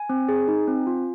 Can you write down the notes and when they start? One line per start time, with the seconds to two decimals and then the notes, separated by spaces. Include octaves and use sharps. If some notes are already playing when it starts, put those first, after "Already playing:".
Already playing: G#5
0.09 C4
0.29 G#4
0.48 D#4
0.67 C4
0.87 F4